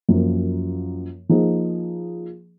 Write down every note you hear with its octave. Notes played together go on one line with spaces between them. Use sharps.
F#2 F3 A#3
F3 A#3 D#4 G#4